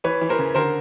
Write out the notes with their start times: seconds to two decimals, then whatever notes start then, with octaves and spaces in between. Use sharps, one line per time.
0.04 E3 B4 C#5
0.21 E3
0.29 A#4 C5
0.39 C#3
0.54 D3 A#4 C5